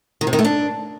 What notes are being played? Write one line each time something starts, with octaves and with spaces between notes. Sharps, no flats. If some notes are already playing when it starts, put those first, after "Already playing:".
D#3
C3
D#3
A3
D4